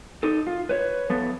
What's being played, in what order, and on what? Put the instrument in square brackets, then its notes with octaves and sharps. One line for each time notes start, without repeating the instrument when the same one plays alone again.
[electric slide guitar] D#4 A4
F4
B4 C#5
F3 B3 A4